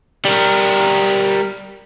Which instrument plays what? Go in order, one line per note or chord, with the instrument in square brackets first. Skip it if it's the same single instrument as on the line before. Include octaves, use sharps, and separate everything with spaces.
[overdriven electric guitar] G3 A#4